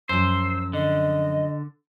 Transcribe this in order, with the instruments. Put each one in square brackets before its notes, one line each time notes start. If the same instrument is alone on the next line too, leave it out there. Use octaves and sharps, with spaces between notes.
[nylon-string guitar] F#2 F3 [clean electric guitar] C5 [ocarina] E6
[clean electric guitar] D3 [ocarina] D#5